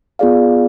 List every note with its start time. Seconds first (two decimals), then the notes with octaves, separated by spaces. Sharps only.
0.19 B3 F4 G#4 D5 F5